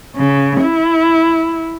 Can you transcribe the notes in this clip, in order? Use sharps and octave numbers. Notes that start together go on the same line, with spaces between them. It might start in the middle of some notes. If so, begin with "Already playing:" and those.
C#3
E4